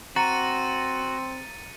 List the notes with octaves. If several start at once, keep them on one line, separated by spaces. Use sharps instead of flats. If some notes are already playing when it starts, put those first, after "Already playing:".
C4 F#4 A#5 A6 C#7 D#7